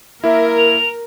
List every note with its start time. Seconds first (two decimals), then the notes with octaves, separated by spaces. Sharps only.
0.24 A#3 E4 A#4 E5
0.57 F7